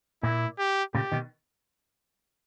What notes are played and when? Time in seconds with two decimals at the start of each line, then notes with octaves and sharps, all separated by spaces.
0.23 A#2 E4
0.59 G4
0.94 A#2 C#3 G4
1.12 B2 D#3